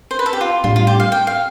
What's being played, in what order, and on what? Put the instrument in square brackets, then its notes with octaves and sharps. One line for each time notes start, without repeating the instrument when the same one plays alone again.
[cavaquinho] C5
B4
A4
G4
F4
[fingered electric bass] A2 G3 D4 [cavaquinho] F4
[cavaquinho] F4
G4
F5
G5
F5